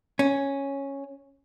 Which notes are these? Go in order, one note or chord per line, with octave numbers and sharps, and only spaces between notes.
C#4